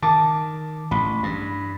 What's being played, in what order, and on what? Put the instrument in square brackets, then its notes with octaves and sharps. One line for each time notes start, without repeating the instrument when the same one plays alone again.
[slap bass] D#3 [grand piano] A5 D6
[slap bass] A1 [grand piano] B5
[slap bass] G2 [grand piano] B5